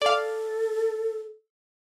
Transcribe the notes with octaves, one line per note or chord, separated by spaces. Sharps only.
A4 D5 F5